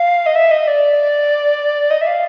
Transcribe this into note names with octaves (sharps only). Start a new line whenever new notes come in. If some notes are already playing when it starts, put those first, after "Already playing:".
Already playing: F5
D#5
E5
D#5
D5
D#5
E5
F5